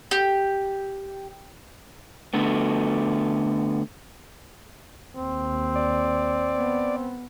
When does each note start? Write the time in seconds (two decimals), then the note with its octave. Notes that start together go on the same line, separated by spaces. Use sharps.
0.11 G4
2.34 D3 A3 B3
5.17 D#2 C4
5.75 D5
6.56 B3